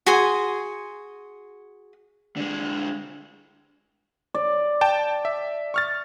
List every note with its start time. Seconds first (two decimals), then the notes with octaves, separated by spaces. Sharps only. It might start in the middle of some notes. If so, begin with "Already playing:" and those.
0.06 F#4 G#4 G#5 C6
2.37 D3 G#3
4.34 D5
4.81 G5 A5
5.25 E5
5.74 C#6 F6 A6